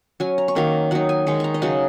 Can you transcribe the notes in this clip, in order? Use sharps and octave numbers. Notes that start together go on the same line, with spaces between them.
F#3 C#4 G#5
A#5
C#6
D#3 F#3 A#3 C#4 A#5
F#3 D#4 F#5
G#5
D#3 G#3 D#4 C#6
A#5 C#6
D#5
C#3 F#3 D#4 F#5